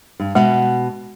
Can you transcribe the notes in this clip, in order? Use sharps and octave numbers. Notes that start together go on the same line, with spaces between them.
G2
B2 G#3 F#5